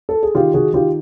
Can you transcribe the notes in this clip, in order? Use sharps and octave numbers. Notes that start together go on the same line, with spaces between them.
A4
G#4
D#3 F4 G4
D#3 F#4 G#4
D#3 F4 G4